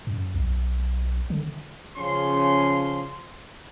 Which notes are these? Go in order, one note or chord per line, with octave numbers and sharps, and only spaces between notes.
F#2
B1
D3
C#3 F3 C#4 C6